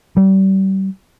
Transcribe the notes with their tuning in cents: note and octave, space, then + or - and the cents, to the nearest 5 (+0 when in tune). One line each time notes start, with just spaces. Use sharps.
G3 -35